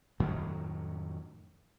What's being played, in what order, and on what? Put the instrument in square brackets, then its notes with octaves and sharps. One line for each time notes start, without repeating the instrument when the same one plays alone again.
[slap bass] F2 A2 D#3 F#3